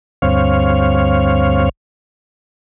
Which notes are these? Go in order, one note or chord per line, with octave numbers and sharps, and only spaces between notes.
D2 G2 C4 C#5 F5